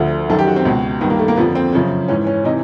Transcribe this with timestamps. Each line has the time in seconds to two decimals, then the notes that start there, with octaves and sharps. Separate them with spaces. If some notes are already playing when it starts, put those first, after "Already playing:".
Already playing: D2 D3 F3
0.30 F#2 D#3 A4
0.39 G4
0.47 F#4
0.56 C4
0.65 C#2 B2
1.01 G2 D#3 B3
1.10 A#3
1.19 A3
1.28 A#3
1.37 F2 D3 F3 B3
1.55 C4
1.73 F#2 C#3 F3
2.08 G#2 E3 C#4
2.27 C#4
2.44 C3 E3 D#4